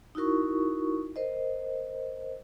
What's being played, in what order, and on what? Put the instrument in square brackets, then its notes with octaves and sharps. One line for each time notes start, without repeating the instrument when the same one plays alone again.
[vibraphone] D#4 E4 F#4 A#4 C#6
A#4 C5 D#5